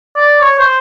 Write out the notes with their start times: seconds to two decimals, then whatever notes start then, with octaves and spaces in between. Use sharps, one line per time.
0.16 D5
0.42 C#5
0.59 C5